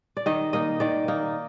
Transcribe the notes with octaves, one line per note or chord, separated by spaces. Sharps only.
D5
D#3 D#5
A#3 D#4 D#5
D#3 D5
A#3 D#4